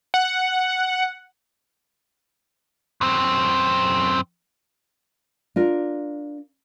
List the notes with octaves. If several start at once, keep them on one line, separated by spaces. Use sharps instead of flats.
F#5
F#2 C4
D4 F4 A#4